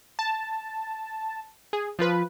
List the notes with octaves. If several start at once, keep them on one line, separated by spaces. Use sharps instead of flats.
A5
G#4
F3 F4 B4